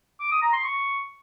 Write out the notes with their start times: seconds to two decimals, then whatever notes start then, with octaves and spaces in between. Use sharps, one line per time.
0.20 D6
0.31 D#6
0.42 A#5
0.53 C6
0.64 C#6